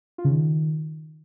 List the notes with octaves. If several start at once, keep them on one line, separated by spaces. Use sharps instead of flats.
F4
C#3
D#3